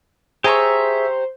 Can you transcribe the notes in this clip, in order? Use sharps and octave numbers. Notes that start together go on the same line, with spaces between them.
G4 G#4 C5 C#5 E5 G#5 A#5 C#6